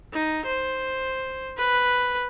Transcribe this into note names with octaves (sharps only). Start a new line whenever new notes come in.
D#4
C5
B4